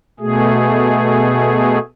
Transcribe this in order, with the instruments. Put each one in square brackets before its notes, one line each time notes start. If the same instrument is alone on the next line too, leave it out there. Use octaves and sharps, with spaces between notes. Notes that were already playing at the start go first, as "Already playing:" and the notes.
[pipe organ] B2 A3 G#4